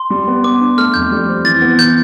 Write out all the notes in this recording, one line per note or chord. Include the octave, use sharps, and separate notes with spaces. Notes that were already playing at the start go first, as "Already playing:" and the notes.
Already playing: C6
G3
B3
B3 D6
D4
A3 F6
F2 G6
G3
C4
E3 A6
B3
E3 G6